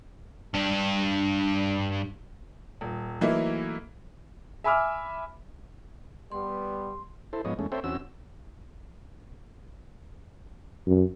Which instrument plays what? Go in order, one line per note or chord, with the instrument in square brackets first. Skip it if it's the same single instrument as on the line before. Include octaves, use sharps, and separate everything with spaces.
[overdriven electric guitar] G2 D4
[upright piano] D#1
E3 F#3 A3 A#3 D#4 E4
E5 G#5 B5 D6 E6 F6
[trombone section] G3 B3 [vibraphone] C6
[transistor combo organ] E4 A4 C5
G#2 F3 B3 C#5 D#5
E2 G#3 A3 C#4
C4 A4 C5 C#5 E5 G5
E2 C4 C#4 F#4 E6
[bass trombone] F#2